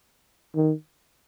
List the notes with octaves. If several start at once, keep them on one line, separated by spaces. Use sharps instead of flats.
D#3